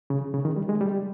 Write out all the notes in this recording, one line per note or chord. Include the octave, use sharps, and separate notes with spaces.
C#3
C#3
D#3
G3
G#3
G3